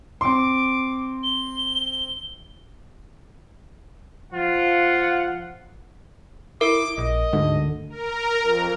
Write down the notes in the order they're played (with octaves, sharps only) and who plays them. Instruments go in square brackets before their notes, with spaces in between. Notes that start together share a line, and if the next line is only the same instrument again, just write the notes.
[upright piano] C4 C6 [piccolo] D6
[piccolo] G7
[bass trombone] F3 [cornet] F4 [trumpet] F#5
[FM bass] E4 [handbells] A#4 [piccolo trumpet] D6
[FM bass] A#1 [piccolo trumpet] D#5
[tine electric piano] D2 D3 [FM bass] G#2
[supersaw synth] A#4
F2